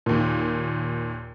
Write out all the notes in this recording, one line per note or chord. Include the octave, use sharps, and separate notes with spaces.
D#2 A#2